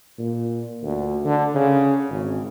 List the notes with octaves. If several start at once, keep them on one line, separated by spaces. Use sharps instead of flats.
A#2
D2
D3
C#3
G#1